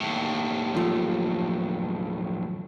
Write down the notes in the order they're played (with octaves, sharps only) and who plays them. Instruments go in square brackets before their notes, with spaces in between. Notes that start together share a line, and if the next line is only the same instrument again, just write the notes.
[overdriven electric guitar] D#2 A2
[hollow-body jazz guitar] F#2 F3 A3